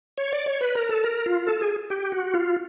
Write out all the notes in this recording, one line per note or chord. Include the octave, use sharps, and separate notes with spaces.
C#5
D5
C#5
B4
A#4
A4
A#4
F4
A4
G#4
G4
F#4
F4